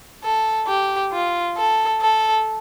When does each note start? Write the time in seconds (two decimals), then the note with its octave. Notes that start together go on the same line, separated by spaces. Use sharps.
0.24 A4
0.67 G4
1.12 F4
1.57 A4
2.01 A4